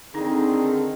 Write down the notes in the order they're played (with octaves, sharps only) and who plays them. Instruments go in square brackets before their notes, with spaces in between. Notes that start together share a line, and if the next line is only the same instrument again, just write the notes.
[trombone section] D3 D#3 [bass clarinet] C4 [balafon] D#4 A#5 [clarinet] G#4